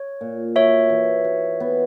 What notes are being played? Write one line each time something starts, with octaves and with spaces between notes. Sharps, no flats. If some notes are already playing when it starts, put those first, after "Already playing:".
Already playing: C#5
A#2
F#4 C#5 E5
E3
F#4
B3